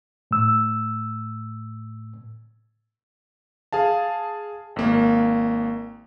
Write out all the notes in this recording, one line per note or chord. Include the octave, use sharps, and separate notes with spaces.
A2 E6
G#4 F5 A5
G#1 A#3